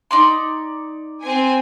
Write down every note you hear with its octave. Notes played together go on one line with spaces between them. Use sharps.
D#4 D5 C6
C4 G#5